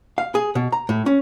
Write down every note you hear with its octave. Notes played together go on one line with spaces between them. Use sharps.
F5
G#4
B2
A#5
A2
C#4